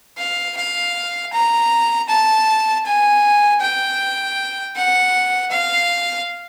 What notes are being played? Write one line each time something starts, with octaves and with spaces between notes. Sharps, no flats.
F5
F5
A#5
A5
G#5
G5
F#5
F5